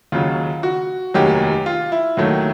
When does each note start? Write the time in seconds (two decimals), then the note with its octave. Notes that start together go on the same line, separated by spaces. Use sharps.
0.12 D#2 C#3 F#3 F4
0.63 F#4
1.14 F1 D#2 D#3 F#3 G4
1.66 F4
1.92 E4
2.17 D#2 D#3 F#3 A3